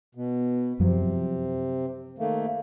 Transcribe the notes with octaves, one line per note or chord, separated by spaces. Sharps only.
B2
F#2 C3 F3 F#3
D#3 A3 A#3